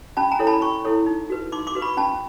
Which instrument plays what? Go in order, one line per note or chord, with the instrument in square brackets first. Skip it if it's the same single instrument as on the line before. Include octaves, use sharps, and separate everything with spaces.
[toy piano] C#4 A5 B5
G#5 A#5
E4 A4 C#5
A5 B5
C#4 B5 C#6
E4 A4 C#5
D#4
F#4 B4
D#4 C6 D6
C6 D6
F#4 B4
B5 C#6
C#4 A5 B5